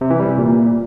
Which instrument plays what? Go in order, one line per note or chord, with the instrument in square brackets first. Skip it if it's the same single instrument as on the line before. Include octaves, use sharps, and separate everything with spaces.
[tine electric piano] C3
E3
G3
C3
A#2